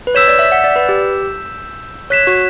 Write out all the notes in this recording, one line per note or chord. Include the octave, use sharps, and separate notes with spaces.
B4
C#5 E6 G6 B6 E7
D5
E5
F#5
D5
B4
G4
C#5 F#6 B6 E7
F#4